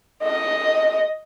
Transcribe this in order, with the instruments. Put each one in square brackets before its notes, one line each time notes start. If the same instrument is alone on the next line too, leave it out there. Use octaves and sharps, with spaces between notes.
[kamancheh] D#5